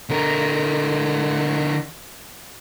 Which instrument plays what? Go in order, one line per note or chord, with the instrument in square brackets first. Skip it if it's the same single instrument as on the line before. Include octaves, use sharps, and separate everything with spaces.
[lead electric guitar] D3 A#4